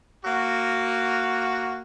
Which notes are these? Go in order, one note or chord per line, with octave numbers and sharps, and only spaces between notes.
A#3 F#4